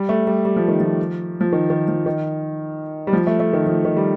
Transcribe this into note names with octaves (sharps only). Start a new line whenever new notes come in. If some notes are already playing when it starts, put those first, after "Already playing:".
Already playing: G3
A3
G3
G3
F3
D#3
F3
F3
D#3
D#3
F3
D#3
G3
F3
A3
A3
D#3
F3
D#3
G3